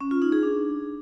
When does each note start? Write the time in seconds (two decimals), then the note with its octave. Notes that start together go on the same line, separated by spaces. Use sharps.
0.01 C#4
0.11 F4
0.22 D#4
0.32 G#4
0.43 D4